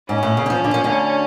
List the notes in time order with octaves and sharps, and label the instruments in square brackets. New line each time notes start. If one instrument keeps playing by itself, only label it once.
[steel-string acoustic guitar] G#2 [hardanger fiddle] C#4
[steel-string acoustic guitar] A2
C#3
D3
F2 F3
D3
F3
D2 D3